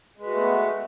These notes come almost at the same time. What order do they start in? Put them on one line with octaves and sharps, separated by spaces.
G#3 B4 F#4 A3 B3